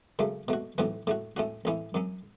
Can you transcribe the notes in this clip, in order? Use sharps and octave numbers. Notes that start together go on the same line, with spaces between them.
F#2 C#3 F#3 A3
B2 A3 F#4
B1 A2 E3 B3 F#4
A2 A3 F#4
A2 A3 C#4 F#4
A1 A2 E3 C#4 E4
F#2 F#3 C#4